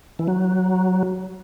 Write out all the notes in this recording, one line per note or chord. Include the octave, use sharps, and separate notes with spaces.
E3
F#3